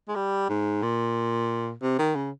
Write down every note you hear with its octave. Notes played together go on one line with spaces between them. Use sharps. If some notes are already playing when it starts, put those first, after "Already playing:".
G#3
G3
G#2
A#2
C3
D#3
C#3